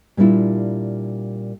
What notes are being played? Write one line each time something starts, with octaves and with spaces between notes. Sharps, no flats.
A#2 G3 A#3 D4 E4 F4